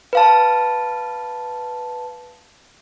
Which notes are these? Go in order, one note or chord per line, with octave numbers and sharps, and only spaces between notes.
B4 F5 A5